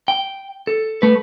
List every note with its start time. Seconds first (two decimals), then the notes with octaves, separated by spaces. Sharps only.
0.08 G5
0.67 A4
1.02 A3 B4